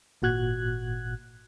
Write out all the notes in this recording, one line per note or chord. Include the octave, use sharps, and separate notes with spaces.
G#1 A#2 F#4 F#6 G#6